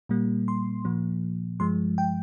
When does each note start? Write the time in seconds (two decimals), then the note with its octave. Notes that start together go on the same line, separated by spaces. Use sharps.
0.09 A#2 G3 A#3
0.48 C6
0.85 A#2 F3 A#3
1.60 G2 F3 G#3 C6
1.98 G5